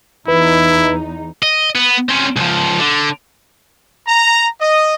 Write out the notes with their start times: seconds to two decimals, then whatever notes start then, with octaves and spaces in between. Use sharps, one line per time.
0.28 E2 D#4 E4 B4
1.43 D#5
1.75 B3
2.09 C4 C#4
2.36 C#2 F3
2.80 D3
4.07 A#5
4.60 D#5